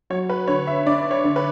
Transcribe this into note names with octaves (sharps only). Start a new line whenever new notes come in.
F#3 C#5
B4
D3 C#5
E5
D4 D5
C#5
D3
B4